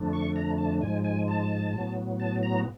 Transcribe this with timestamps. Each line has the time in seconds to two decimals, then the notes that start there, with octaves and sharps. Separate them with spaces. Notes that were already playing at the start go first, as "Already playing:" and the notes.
Already playing: F2 D3 F3 A3 D4
0.13 C#6
0.36 A#5
0.58 A5
0.81 G#2 F3 G#3 G#5
1.04 G#5
1.28 A5
1.73 A2 F#3 B3
2.20 A5
2.43 A#5